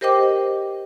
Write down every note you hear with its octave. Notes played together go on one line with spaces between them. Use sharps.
G4 A#4 C5 D#5 G5 D6